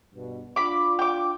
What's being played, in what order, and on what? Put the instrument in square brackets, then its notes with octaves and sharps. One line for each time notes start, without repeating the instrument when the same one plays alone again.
[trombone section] G2 B2
[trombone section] D4 F4 [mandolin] B5 D6
[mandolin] G5 D6